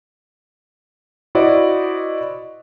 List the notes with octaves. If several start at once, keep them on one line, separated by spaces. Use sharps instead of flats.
E4 F#4 C5 D5 D#5